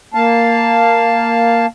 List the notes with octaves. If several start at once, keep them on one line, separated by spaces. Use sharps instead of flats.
A#3 F5 A5